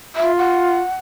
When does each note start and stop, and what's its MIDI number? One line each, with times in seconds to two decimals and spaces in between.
0.16 0.81 65
0.16 0.32 76
0.38 0.96 78